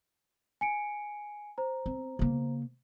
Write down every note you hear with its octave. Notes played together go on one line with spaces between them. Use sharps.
G#5 C#7 D7
C5 A#5
C4
C#3 A#3